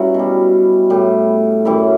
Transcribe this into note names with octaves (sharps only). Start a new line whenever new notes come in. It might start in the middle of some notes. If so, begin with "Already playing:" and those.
Already playing: G2 F#3 C#4 E4 F#4
B2 G3
A2 G3
F#2 E3 G3 E4